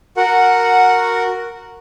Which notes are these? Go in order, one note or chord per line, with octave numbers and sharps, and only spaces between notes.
F#4 A#4 F#5